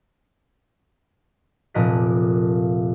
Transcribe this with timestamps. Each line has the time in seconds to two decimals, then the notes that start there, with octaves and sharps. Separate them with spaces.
1.74 F1 A#2 A#4 D#5 F#6 B6